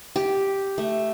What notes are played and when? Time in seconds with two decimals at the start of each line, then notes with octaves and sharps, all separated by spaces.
0.16 G4
0.78 A3